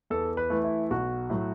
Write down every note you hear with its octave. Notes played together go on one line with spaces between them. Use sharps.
E2 A4
B4
E3 A3
E4
B1 F#4
A2 F#3 A3